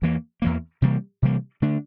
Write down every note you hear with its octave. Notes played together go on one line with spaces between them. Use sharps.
E2 E3 A#3
E2 E3 A#3
C3 E3 G3 A#3
C3 E3 G3 A#3
D3 A3 D4